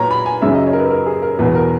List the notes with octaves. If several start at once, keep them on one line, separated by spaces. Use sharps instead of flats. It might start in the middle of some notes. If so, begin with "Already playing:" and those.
Already playing: A#2 F#3 B4 C#5 A#5
B5
G#5
F#2 C#3 F#3 E5
D#5
C#5
A#4
B4
A#4
G#4
A#4
E2 B2 F#3 B4
A#4